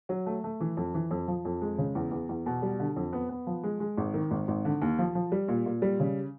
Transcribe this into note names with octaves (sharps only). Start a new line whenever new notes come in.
F#3
A3
A3
E3
F2
E3
F2
F3
F2
G#3
C#3
E2
E2
E2
B2
G3
D3
F2
B3
B3
F3
G#3
G#3
G#1
D#3
G#1
G#1
D3
D#2
F3
F3
G3
A#2
A#2
G3
C#3